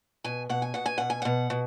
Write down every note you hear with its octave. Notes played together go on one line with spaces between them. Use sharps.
B2 G#5
B2 F#5
G#5
B2 F#5
G#5
B2 F#5
G#5
B2 F#5
B2